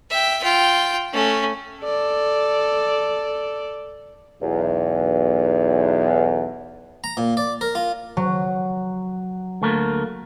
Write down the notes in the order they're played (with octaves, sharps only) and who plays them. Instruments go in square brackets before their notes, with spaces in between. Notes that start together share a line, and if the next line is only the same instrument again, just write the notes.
[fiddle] E5 G5
F4 G5
A3 C#4
[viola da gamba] A4 D5
[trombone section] B1 E2
[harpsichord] A#5
A#2
D5
A#4
F4
[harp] F#3
[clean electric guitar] D2 A3 A#3